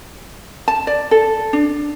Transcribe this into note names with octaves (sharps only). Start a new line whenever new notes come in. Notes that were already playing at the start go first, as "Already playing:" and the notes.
A5
D5
A4
D4